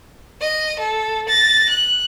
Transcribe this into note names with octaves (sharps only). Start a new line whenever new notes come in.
D#5
A4
A6 A#6
F#6